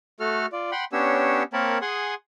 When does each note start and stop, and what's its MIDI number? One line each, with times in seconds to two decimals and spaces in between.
0.20 0.46 57
0.20 0.46 66
0.20 0.46 69
0.20 0.46 89
0.52 0.71 65
0.52 0.71 74
0.72 0.85 78
0.72 0.85 79
0.72 0.85 83
0.72 0.85 84
0.93 1.43 59
0.93 1.43 61
0.93 1.43 62
0.93 1.43 67
0.93 1.43 73
0.93 1.43 88
1.53 1.78 58
1.53 1.78 60
1.53 1.78 70
1.53 1.78 73
1.53 1.78 81
1.53 1.78 83
1.82 2.14 68
1.82 2.14 78
1.82 2.14 80
1.82 2.14 84
1.82 2.14 87